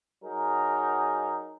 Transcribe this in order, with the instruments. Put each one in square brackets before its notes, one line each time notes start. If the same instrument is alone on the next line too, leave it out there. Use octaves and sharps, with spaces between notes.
[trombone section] F#3 D#4 G#4 A#4